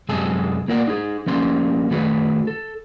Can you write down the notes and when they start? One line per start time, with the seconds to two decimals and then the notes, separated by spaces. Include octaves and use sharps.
0.09 C2 F#2 C3 G#3 A4 G#5
0.68 A#3 F4 A#4 D5 F#5
0.88 D#4 G#4
1.26 F3 G3 A#3 C#4 C6
1.91 D#3 A3 F#4 G#4 B4
2.47 A4